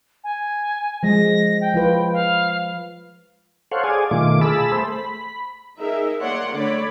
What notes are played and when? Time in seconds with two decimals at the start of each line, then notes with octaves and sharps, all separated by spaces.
0.24 G#5
1.03 F3 G#3 A#6
1.61 G5
1.74 F3 F4 B4
2.13 F5
3.72 A4 C5 C#5 F5 F#5
3.84 G#4 D5 G#5
4.11 B2 D#3 A3 F4 D6
4.41 G#4 A5 B5 E6
4.72 A3 C5
4.92 B5
5.79 D#4 G#4 A#4 E5
6.22 A#3 C#5 D5 F#5 C6
6.54 D3 A3 C#5 D5 B5